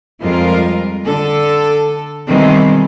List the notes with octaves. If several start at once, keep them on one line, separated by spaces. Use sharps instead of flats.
F2 G3 G#3 F4 A#4
D3 A4
B2 D#3 E3 G3 G#3 C4